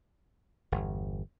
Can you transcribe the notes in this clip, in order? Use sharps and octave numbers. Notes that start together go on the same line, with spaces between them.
G1 E2